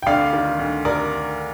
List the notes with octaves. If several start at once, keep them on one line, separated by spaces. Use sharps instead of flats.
G5
D2 D5 F5
D#3
D2
A#4 D5